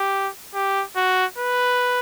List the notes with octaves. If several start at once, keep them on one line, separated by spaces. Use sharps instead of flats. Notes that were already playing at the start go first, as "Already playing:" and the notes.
Already playing: G4
G4
F#4
B4